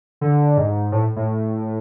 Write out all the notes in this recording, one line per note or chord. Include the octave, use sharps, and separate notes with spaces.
D3
G#2
A2
A2